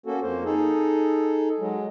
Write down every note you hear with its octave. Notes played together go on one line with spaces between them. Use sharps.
A#3 C#4 F#4 A4
F2 A#3 C5
D#4 G#4 A4
F#3 G#3